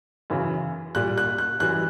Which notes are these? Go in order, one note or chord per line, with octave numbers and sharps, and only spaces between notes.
F#2 C#3 E3
A#2 G3 F#6
F#6
F#6
F#2 E3 G3 F#6